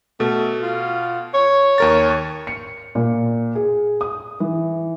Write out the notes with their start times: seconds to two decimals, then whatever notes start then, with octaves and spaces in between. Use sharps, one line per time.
0.20 B2 A3
0.62 F4
1.34 C#5
1.78 D#2 A#4 A6
2.47 C#7
2.95 A#2
3.55 G#4
4.01 D#6
4.40 E3